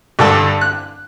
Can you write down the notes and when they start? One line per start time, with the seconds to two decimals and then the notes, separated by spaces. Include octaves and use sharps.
0.19 G2 D3 A4
0.61 F#6